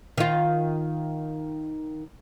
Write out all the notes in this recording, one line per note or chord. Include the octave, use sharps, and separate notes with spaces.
D#3 F4